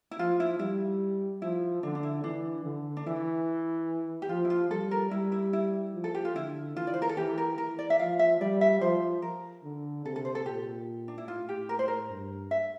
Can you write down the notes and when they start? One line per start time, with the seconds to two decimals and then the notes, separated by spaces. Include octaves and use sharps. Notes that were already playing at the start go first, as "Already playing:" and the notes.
0.11 E4
0.19 F3 F4
0.40 E4
0.59 G3 E4
1.42 F3 E4
1.83 D3 D4
1.95 D4
2.03 E4
2.24 E3 D4
2.65 D3
2.97 D4
3.06 E3 E4
4.22 G4
4.29 F3 F4
4.45 E4
4.50 F4
4.71 G3 A4
4.91 A#4
5.11 G3 E4
5.32 E4
5.53 E4
5.95 F3
6.04 A4
6.15 G4
6.25 F4
6.35 D3 E4
6.76 E3 F4
6.87 D5
6.94 C5
7.02 A#4
7.09 A4
7.17 E3 G4
7.38 A#4
7.58 E3 A#4
7.79 D5
7.90 E5
7.99 F3 F5
8.19 E5
8.41 G3 D5
8.61 E5
8.81 F3 C5
9.22 A#4
9.64 D3
10.05 C3 A4
10.16 A4
10.25 C5
10.35 A4
10.46 A#2 G4
11.08 D4
11.18 E4
11.28 A2 F4
11.49 G4
11.69 A#4
11.79 C5
11.88 A#4
12.10 G2
12.51 E5